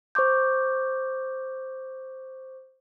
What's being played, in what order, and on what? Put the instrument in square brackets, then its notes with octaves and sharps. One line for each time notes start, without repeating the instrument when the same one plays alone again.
[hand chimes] C5 C#6 D6 G6